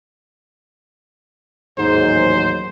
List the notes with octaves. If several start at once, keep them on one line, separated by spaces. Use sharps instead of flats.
A1 D#2 G#2 F#3 C5